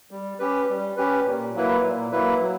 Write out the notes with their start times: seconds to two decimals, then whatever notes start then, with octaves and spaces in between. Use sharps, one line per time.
0.11 G3
0.39 C#4 G4 B4
0.69 G3
0.97 C#4 G4 B4
1.26 A#2
1.54 F#3 A#3 E4 B4
1.83 A#2
2.11 F#3 A#3 E4 B4
2.40 F#3